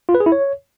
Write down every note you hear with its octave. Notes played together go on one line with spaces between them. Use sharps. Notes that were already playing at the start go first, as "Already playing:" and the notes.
F4
B4
G#4
E4
C#5